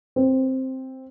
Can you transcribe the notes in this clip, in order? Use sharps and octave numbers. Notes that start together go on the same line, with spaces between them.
C4